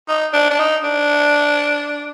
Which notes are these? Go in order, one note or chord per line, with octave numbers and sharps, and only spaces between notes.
D#4
D4
D4
D#4
D4